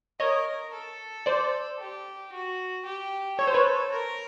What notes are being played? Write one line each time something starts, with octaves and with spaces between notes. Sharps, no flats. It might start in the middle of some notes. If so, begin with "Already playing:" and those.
A#4 C#5 D#5
A4
C5 D5
G4
F#4
G4
A4 C#5
C5
B4 C#5
A#4